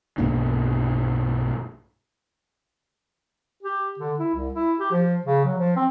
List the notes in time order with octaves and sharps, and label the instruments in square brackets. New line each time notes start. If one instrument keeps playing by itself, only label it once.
[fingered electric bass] B1 G2 A#3 D4
[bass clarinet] G4
D3
E4
C2
E4
G4
F3
C#3
F#3
F3
C4